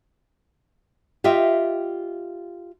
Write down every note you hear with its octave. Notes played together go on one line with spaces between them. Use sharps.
F4 G4 D#5 E5 G5